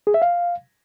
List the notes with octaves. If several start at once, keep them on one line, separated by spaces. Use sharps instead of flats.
G#4
E5
F5